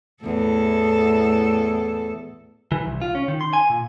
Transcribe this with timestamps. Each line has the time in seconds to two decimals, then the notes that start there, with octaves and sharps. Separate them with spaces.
0.23 E2 A2 A4
2.72 E3
2.85 C2
3.02 F4
3.15 C#4
3.28 D#3
3.41 C6
3.53 G#5
3.70 A#2